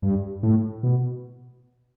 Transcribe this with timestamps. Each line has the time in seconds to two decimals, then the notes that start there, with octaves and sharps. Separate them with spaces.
0.02 G2
0.43 A2
0.83 B2